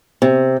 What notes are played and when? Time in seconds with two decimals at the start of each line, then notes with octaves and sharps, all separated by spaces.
0.22 C3